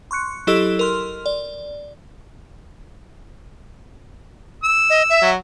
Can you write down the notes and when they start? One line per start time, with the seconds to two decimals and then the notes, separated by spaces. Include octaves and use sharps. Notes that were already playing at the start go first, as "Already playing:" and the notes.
0.11 C6 C#6 F#6 C#7
0.47 F#3 E4 G4 A4 D#5 E6
0.79 A#4 C6 F6
1.26 D5
4.64 E6
4.90 D#5
5.10 E5
5.22 F#3